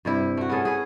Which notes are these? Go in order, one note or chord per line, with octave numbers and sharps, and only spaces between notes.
G2 C3 E4
A3 F#4
B3 C#4 G#4 A4
G#4 B4